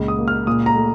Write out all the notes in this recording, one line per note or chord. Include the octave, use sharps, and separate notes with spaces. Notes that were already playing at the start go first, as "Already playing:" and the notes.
Already playing: C#2 A#2
D#6
A#3
F6
A#2 D#6
A#5
A3